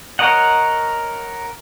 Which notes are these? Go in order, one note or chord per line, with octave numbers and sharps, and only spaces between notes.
A#4 C#5 D#5 F#5